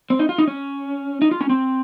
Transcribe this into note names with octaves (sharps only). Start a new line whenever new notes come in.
C4
D#4
F4
D#4
C#4
D#4
F4
C#4
C4